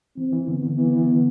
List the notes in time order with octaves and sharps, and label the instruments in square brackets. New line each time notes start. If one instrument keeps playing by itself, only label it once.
[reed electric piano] E3 [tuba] C4
[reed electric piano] E3
[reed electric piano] D3 [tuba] B3
[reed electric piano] D3
[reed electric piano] E3 [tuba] B3
[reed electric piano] E3
D3